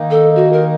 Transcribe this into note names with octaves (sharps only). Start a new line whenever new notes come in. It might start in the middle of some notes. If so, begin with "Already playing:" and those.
Already playing: D#3 A#3 D#4
A4
F#4
A#4